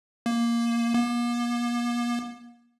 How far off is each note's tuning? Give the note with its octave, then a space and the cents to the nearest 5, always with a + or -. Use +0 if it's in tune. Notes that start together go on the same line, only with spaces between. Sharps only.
A#3 +5
A#3 +45